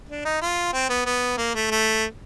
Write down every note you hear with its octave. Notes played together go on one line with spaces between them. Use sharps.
D4
D#4
F4
C4
B3
B3
A#3
A3
A3